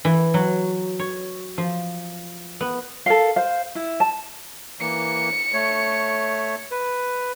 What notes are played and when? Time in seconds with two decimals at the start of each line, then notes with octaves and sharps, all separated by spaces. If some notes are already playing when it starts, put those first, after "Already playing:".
0.05 E3
0.34 F#3
0.99 C#5
1.58 F3
2.61 B3
3.06 A4 A#4 F5
3.36 C5 F5
3.75 E4
4.00 A5
4.80 E3 A#3 C#7
5.54 A3 C#5
6.71 B4